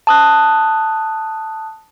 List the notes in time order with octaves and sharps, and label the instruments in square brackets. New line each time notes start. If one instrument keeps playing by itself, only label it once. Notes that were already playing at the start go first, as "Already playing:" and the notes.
[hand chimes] A5 D#6 F#6